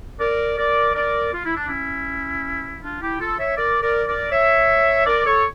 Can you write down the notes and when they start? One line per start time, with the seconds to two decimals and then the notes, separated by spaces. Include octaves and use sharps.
0.20 A#4 D5
0.58 A#4 D5
0.95 A#4 D5
1.33 F4
1.45 E4
1.57 D4
1.68 C#4 E4
2.82 D4 F4
3.01 E4 G4
3.19 F4 A4
3.39 C#5 E5
3.58 A#4 D5
3.82 A#4 D5
4.08 A#4 D5
4.32 C#5 E5
5.06 A#4 D5
5.25 A4 C#5